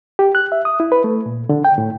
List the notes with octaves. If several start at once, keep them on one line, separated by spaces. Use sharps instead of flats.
G4
F#6
E5
D#6
E4
B4
A3
A#2
D3
G5
A2